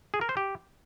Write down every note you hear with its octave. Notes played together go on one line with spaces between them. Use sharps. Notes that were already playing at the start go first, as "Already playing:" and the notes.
G#4
A#4
C5
G4